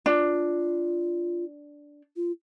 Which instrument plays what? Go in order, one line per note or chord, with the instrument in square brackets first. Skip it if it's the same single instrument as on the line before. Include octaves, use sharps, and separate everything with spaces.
[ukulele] D4 [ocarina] F4
[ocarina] F4